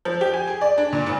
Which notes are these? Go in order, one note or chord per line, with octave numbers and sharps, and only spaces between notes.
F3
G4
G#5
G#4
D5
D4
A#2
G#1